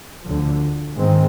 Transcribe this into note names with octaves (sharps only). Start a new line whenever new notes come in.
D2 D3 F3
G#2 D#3 G#3 C4